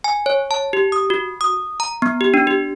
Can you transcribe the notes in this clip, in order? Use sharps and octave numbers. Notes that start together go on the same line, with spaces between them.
G#5
C#5
A5
G4
D#6
F#4
D#6
A#5
B3
G4
D4
G4